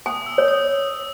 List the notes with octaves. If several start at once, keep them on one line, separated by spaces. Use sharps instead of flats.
G#5 D#6
E6
C#5
D#6